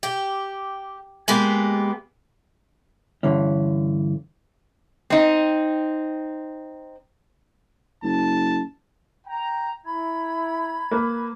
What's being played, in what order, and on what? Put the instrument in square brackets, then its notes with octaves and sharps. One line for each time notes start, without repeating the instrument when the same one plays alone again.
[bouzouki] G4
G#3 A#3 B3 G4
[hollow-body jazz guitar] G2 D3 E3 C#4
[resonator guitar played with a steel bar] C4 D#4
[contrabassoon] F#1 [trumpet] A5
[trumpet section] G5 A#5
[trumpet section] E4 [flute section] A#5 B5 G#6
[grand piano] A#3 B4